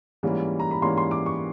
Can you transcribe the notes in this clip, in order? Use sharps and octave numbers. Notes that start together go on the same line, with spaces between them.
G#2 E3 G3 A#3 C#4
A#5
B5
G#2 E3 G3 A#3 C#4 C6
C6
D6
C#6